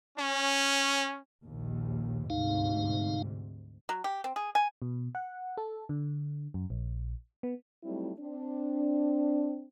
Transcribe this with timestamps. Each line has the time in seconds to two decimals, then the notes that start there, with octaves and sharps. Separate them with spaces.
0.18 C#4
1.44 A#1 D#2
2.30 D2 G#2 C3 D#4 F5
3.89 F#3
4.04 G4
4.24 C4
4.36 G#4
4.55 G#5
4.82 B2
5.15 F#5
5.57 A4
5.89 D3
6.54 F#2
6.70 A#1
7.43 B3
7.83 F#3 G3 A3 C4 D#4 E4
8.20 C4 D4